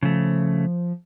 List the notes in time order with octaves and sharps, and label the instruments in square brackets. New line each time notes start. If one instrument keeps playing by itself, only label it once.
[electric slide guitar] C#3 A3 [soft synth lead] F3